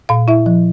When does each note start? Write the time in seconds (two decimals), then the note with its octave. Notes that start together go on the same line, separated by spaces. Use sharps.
0.09 A#2 F5
0.28 E4 E5
0.46 F3